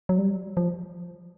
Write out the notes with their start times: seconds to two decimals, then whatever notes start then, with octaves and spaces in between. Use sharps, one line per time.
0.09 F#3
0.18 G3
0.57 F3